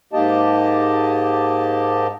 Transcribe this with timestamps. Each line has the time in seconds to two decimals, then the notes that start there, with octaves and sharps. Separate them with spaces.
0.13 G#2 A#3 G4 D#5 A5